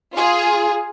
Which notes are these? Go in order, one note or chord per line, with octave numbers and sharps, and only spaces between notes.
F4 G#4